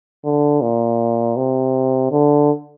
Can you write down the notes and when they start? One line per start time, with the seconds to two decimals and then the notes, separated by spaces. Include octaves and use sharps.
0.25 D3
0.62 A#2
1.37 C3
2.12 D3